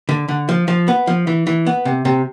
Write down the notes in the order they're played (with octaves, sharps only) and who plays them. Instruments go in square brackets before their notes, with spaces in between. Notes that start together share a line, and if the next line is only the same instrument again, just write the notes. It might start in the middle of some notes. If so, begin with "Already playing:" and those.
[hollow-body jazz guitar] D3
D3
F3
F3
B3
F3
E3
E3
B3
C3
C3